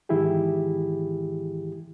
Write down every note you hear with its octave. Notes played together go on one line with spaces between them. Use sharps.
G#2 D#3 E3 E4 G4 G#4